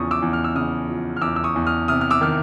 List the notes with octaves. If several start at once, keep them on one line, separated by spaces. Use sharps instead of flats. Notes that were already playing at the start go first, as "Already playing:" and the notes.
Already playing: E2 C#3 F3 C#6 D#6
D6 E6
E2
F6
E6
C#3 D#6 F6
F3
F6
E2 D6 E6
E6
C#6 D#6
E2
D#6 F6
C3 D#6 F6
F6
D6 E6
D#3 F6